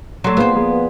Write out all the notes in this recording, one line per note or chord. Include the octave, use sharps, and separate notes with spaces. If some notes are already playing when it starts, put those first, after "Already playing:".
F#3 A3 D5 C6
A#3 B3 F4 G#4 C5
F3 A#3 G#4
B4